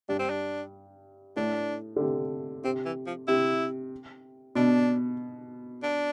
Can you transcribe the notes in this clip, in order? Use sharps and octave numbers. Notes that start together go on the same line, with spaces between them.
G2 D4
C4
D4
A2 D4
D3
C3
C3 C4
E3
F3
C3 E4
B2 D4
D4